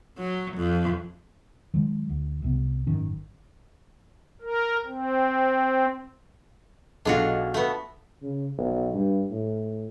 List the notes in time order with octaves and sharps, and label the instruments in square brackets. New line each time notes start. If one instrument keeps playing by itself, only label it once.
[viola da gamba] F#3
F2
[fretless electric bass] D#3 F#3 G#3
D2
C2 C3 B3
G#1 F#2 D#3 C#4
[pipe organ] A#4
C4
[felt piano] B1 G#4 A4 [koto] D4 F4 F#4
[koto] A3 B3
[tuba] C#3
B1
G2
A2